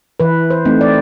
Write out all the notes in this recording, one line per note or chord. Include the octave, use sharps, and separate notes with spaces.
E3 B4
C5
A3 C4 D#4
D5